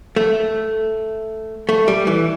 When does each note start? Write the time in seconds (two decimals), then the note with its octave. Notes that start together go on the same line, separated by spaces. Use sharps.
0.16 A3
1.69 A3
1.88 G3
2.07 E3